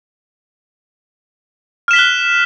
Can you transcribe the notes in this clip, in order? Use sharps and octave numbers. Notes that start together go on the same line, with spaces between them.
F6 F#6 B6 E7 G7